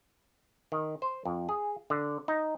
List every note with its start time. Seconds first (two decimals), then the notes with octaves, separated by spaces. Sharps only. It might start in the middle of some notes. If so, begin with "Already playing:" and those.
0.72 D#3
1.02 C5
1.25 F2
1.49 G#4
1.90 D3
2.28 D#4